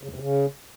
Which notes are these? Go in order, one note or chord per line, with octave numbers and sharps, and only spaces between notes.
C#3
E2
C3
C#3